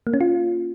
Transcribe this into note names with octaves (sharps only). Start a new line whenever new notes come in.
A#3
C#4
F4